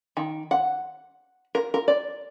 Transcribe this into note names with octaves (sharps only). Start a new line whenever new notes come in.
D#3
F#5
A#4
A#4
D5